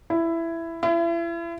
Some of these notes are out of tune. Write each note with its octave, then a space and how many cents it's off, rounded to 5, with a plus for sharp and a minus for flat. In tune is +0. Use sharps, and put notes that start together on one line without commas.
E4 +10
E4 +35